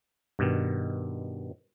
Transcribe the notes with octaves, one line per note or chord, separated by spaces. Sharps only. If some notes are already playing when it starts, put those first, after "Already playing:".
G2 B2 D#3